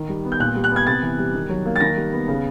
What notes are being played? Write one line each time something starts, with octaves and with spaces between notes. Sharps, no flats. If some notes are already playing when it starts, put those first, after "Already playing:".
Already playing: D#3
G3
B3
G6
A#2 F#6
G3
F#6
B3
G#6
C3 A6
E3
G3
D#3
F#3
A#3
A6
D#3 A#6
G3
B3
C#3